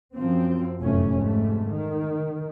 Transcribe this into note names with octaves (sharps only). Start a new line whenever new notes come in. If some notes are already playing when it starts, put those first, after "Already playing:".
F#2 F3 C4
F1 F#2 A2 A3 C#4
G#2 C3 A3
D#3